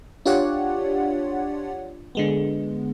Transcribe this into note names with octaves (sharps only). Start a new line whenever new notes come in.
D4 F4 G4 C#5 D5 F#5
D3 G#3 B3